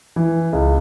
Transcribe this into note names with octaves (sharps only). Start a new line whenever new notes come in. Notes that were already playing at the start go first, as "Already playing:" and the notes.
E3
C#2